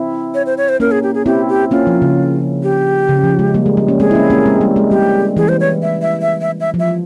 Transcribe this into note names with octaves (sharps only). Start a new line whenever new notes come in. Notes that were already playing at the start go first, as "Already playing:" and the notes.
Already playing: C4 E4
C#5
C5
C#5
C5
A#3 C#4 A#4
G#4
G4
G#4
C4 E4 G4
G4
A#3 C#4 F4
F3
C#3
G4
C#3
F3
G#3
G3 A#3
G#3
G3
A#3 C#4
G#3 C4 G#4
E4
A#3 C#4
A#3 C#4
G#3 C4
G3 A#3
G#3
G3 G4
E3 G#4
C5
C#5
E5
E5
E5
E5
E5
F3
E5